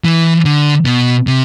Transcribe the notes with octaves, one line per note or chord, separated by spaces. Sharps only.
E3
D3
B2
C3